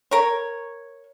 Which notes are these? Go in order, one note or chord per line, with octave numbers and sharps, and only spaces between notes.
A#4 C#5